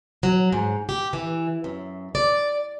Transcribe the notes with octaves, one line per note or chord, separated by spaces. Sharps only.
F#3
G#2
G4
E3
F#2
D5